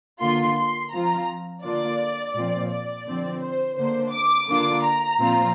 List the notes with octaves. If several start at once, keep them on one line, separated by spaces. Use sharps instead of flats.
D3 A#3 F4 C6
C6
F3 C4 F4 A#5
D3 A#3 D4 F4 D5
A#2 F3 C4 F4
D5
D3 F3 C4
C5
D3 A#3 D4 C5
D6
D3 A#3 D4 F4 D6
A#5
A#2 F3 C4 F4